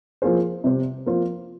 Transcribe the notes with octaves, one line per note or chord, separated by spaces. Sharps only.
F3 A#3 F4 G#4 C5
C3 G3 C4 G4 C5
F3 A#3 F4 C5